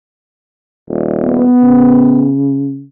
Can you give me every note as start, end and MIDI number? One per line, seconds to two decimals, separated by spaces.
0.89 1.45 27
1.24 2.28 59
1.63 2.84 49